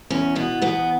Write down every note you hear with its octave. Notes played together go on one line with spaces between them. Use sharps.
E2 C#4
B2 B3
E2 B3